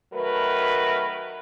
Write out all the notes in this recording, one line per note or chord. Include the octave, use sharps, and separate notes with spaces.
D#3 F#3 A3 A#4 B4